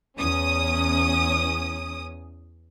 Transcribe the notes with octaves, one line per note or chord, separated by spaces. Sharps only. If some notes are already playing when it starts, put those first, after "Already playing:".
E2 C#4 D#6